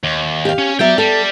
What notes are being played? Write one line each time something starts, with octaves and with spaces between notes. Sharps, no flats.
D#2
G4 F5
C#4
F#3 B3 D5 E5 G5
G3 A4